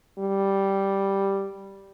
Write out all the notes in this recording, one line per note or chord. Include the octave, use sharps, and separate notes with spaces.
G3